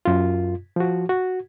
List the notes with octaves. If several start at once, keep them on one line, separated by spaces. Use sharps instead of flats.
F#2 F4
F3 F#4
F#4